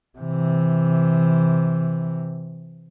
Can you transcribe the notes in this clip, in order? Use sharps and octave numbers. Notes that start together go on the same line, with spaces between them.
C3 E3